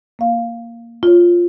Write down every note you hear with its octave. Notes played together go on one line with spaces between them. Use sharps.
A#3 F5
F4 C#5